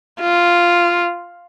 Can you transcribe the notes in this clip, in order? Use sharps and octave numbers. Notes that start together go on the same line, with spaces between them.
F4